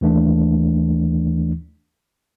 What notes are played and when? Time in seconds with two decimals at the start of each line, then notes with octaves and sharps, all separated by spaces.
0.01 D#2 E3 A3 D4